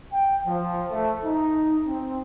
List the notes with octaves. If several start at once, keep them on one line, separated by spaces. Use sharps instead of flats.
G5
F3
A3
D#4
C4